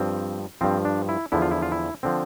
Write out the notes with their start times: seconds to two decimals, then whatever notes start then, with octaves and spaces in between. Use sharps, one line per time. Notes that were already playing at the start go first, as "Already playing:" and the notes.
Already playing: G2 F3 C4
0.61 G2 F3 C4
0.85 D4
1.09 E4
1.32 E2 D3 F3 E4
1.42 F4
1.51 E4
1.62 F4
1.72 E4
2.03 D3 F3 C4